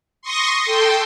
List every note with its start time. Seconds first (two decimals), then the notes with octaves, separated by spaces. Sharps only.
0.22 C6 C#6 D#6 A#6
0.65 A4 G5 C6